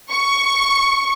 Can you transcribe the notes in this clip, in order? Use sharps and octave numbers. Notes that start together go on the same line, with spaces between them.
C#6